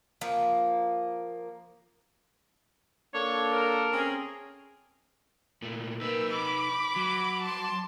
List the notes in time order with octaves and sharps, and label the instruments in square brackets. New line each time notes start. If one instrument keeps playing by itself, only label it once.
[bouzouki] F3 A#3
[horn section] A#3 D4 A4 [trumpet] C#5
[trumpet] A#4
[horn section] C4 C#4 G#4
[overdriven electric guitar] A#2 A3
[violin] A#3 [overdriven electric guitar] D#4 B4 [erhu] E6
[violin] B5 [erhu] D6
[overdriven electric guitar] F#3
[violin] A5 C6